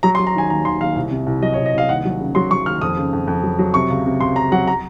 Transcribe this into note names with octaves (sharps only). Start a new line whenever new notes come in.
F#3 A#5
C6
F#3
A#5
D#3 G#5
D#2 A#5
D#2 C6
D#2 F5
C2
C3
C2
F#3 D#5
C#5
C2
D#5
C2 F5
D#2 F#5
F#3
C#3
F#3 C6
F#3 C#6
D#2 F6
F2 D#6
C#3
F2
F2
F#3
F#3
C3 C#6
C#2
C3
C#2 C6
C#2 A#5
F#3 F#5
A#5